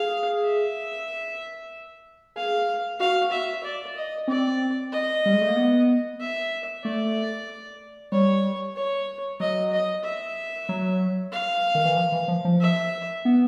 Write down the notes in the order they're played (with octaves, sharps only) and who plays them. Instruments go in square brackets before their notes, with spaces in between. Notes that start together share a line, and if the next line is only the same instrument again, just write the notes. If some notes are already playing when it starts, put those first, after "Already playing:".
Already playing: [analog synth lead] G#4 [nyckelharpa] F5
[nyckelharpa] E5
[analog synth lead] G#4 [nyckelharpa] F5
[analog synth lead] F#4 [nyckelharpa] F5
[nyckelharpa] E5
D5
D#5
[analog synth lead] C4 [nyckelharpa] D5
[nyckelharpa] D#5
[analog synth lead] G3
G#3
A3
A#3
B3
[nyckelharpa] E5
[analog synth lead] A3 [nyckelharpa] D5
[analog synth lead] G3 [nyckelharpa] C#5
[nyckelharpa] C#5
[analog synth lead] F#3 [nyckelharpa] D#5
[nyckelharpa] D#5
E5
[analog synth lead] F#3
[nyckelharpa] F5
[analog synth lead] D#3
E3
F3
E3
F3
F3
[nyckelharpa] E5
[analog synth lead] B3